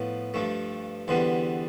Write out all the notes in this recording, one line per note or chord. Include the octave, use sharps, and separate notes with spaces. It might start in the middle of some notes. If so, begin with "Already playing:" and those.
Already playing: A2 F3 B3
G2 F3 A3
E2 D3 G3 B3 C5